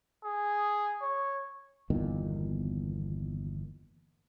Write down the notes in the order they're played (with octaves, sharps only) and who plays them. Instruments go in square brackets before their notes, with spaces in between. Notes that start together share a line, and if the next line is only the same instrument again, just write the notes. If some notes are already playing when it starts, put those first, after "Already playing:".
[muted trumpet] G#4
C#5
[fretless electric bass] G1 E2 A#2 D#3